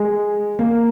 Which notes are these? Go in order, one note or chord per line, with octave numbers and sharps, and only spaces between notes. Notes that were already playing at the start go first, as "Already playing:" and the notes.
Already playing: G#3
A#3